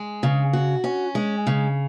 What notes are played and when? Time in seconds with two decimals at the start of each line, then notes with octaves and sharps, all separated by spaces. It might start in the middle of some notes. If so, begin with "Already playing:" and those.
Already playing: G#3
0.23 C#3
0.53 F#4
0.84 C#4
1.15 G#3
1.47 C#3